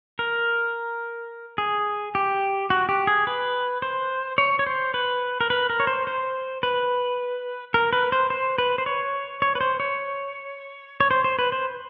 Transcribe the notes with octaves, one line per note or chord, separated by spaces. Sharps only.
A#4
G#4
G4
F#4
G4
G#4
B4
C5
C#5
C#5
C5
B4
A#4
B4
A#4
C#5
C5
C5
B4
A#4
B4
C5
C5
B4
C5
C#5
C#5
B4
C5
C#5
C#5
C5
C5
B4
C5